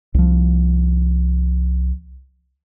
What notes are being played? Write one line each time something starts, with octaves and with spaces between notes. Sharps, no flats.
C2 F3